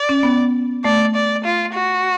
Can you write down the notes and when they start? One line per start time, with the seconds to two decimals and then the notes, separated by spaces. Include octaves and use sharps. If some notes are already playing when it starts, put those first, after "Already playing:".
Already playing: D5
0.09 C#4
0.23 B3
0.84 A3 D5
1.15 D5
1.44 F4
1.74 F#4